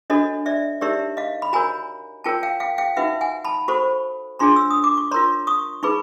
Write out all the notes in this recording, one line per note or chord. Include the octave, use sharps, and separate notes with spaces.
D4 F#4 A4 C#5 D#5
D5 E5
D#4 G4 A#4 C#5 D5 E5
D#5 F5
B5
F#4 A#4 C#5 G#5 A#5
F4 A#4 C#5 G5 A5
F5 G5
F5 G5
F5 G5
D#4 F#4 B4 E5 F#5
F#5 G#5
A5 B5
F#4 A4 C5 B5 C#6
D4 F4 G#4 C#5 A#5 C6
E6
D#6
D6
C#6
F4 A#4 C#5 A#5 C6
C#6 D#6
D#4 G#4 B4 B5 C#6